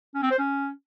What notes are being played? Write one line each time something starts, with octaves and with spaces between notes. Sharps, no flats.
C#4
C4
C5
C#4